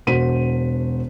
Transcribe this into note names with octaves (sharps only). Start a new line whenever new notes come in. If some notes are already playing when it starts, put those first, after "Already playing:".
E1 F#4 C5 B6 D#7